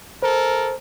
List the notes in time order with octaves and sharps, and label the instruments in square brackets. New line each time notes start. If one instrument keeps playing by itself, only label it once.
[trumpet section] A4 A#4 [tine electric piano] C5